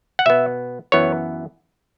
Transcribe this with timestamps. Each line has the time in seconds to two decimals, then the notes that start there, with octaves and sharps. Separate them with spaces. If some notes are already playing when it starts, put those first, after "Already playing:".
0.19 F#5
0.26 B2 B3 E5
0.92 F#2 E3 B3 C#5